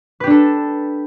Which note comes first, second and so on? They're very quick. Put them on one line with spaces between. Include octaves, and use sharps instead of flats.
B4 G4 D4 A4